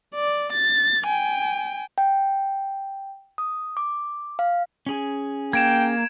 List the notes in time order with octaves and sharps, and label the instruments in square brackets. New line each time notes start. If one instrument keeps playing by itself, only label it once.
[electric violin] D5
A6
G5 G#5
[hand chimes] G5
D#6
D6
F5
[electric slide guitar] C#4 G#4
[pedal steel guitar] A#3 [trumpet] G5 [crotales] G#6 D7 E7